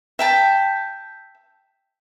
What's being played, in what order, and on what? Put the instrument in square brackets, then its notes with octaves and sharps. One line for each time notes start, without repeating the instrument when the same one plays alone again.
[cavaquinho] E5 G5 A5